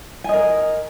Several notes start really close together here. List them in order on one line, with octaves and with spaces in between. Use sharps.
G#5 D#5 A#4